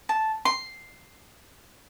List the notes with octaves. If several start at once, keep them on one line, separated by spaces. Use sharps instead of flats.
A5
C6